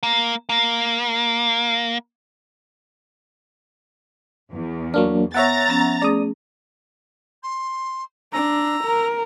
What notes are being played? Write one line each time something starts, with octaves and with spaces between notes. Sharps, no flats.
A#3
A#3
E2
F#3 A#3 D4 C#6 F6
B3 C#5 E5 F#5 A#5 A6
F3 B3 C#4
A3 C#4 G#4 D5 D#6
C6
D4 A#5 E6
A#4